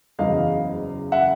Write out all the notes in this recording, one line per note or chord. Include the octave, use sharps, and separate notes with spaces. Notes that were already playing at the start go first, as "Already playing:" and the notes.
F#1 E2 C#3 F#3 D#5 F5
E5 F#5